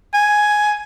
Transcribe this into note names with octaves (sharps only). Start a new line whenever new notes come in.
G#5